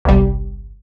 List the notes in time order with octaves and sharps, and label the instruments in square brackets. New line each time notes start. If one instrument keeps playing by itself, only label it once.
[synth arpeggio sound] G1 C2 G3